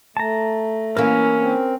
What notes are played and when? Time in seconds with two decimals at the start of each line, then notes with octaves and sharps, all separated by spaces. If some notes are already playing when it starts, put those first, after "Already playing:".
0.17 A3 A5 A#5
0.97 E3 A#3 C#4 A#4
1.38 C4